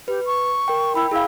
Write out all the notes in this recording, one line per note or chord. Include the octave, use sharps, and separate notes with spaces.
G4 B4
C#6
A#4 G5
E4 G5 B5
E4 G#4 F5